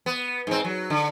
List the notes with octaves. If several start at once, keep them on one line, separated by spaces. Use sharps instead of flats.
B3
G#2 C4
F#3
D3